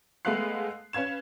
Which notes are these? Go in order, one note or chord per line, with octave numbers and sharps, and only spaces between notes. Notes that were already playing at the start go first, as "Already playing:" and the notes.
G#3 A3 B3 F5 F#6 C7
C#4 B4 F5 G#6 E7